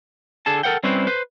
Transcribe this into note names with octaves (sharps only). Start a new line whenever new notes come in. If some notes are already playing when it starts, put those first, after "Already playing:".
D3 G#4 A4 A5
A4 A#4 C5 F#5 G5
G3 C4 C#4 E4 B4 C5
B4 C5